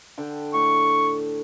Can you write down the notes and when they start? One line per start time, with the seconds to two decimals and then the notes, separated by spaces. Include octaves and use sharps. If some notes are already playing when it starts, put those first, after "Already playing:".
0.18 D3 G5
0.53 A2 C#6